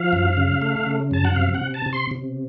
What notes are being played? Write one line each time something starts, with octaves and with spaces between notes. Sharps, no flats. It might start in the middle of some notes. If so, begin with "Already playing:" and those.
Already playing: F3 F5
F#2
C#3
A3
C#3
F#2 A5
F#5
C3 F5
F#5
C3
A5
C3
C6
C3